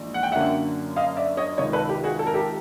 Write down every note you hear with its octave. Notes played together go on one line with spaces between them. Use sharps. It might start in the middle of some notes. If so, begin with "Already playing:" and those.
Already playing: A#1 G#2 E3
F#5
G5
F#2 D3 F#3 A#3 C#4 E5 F#5
D#5 F5
D5 E5
C#5 D#5
C#2 C3 D#3 C#5 D#5
A4 B4
G4
F#4 G#4
A4
A#4
G4 A4